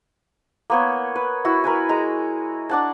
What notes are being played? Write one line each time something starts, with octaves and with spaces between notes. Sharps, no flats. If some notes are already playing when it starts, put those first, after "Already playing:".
A#3 B3 C#5
B4
E4 F#4
A#4 B4 G#5
G#3 A#5
D4 F#5 A5